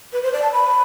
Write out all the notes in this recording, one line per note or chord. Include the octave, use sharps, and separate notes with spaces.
B4
C5
D5
A5
B5